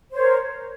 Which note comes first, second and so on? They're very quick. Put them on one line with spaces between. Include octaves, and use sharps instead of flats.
C5 C#5 A#4